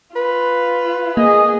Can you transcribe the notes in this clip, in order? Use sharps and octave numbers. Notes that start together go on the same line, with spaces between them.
F4 B4
A#3 G#4 D#5